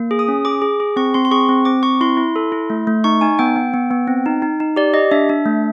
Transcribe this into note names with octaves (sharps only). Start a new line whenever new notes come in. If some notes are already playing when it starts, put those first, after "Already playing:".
Already playing: A#3
G#4
D#6
C#4
G#4 D6
G#4
G#4
C4 C#6
C4 C6
C6
G#4 C#6
C4
C4 D6
C4 C#6
E4 C6
E4
A4
E4
A3
A3
D#4 C#6
D#4 G#5
B3 G5
B3
B3
B3
C4
D#4
D#4
D#4
G4 D5
G4 D#5
D4 E5
D4
A3